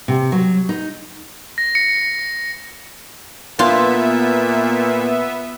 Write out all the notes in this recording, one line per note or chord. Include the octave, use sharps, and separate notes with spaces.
C3
F#3
D#4
A#6
C#7
A#2 B3 F4 E5